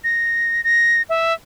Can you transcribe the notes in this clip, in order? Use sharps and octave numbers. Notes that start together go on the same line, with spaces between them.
A#6
A#6
E5